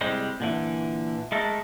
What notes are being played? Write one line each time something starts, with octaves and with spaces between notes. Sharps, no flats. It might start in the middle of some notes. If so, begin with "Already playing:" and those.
C2 G3 G#3 C5
A#2 D3 E3
G#3 A3 A4 A#4